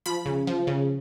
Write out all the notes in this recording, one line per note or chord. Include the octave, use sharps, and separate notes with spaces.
F3 B5
C#3
F3
C#3